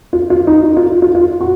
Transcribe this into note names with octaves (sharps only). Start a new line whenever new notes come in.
F4
F4
D#4
D#4
F4
F4
F4
F4
F#4